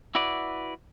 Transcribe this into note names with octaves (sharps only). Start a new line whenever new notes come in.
E4 F#4 B4 D5